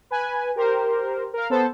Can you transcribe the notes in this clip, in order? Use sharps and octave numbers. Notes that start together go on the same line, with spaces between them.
B4 G#5
G4 A#4 C5
A#4 F5
B3 A4 C5